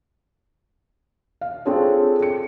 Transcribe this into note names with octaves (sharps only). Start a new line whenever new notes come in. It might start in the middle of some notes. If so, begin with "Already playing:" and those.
F5
C4 D4 F4 G#4 A4 C#5
C#7